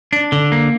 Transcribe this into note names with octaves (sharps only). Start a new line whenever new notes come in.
D4
D3
A#3